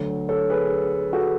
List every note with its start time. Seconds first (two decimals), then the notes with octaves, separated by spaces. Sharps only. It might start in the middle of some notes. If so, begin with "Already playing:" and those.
Already playing: D2 D3 F#3
0.29 A4 C#5
0.50 G#4 B4
1.13 F#4 A4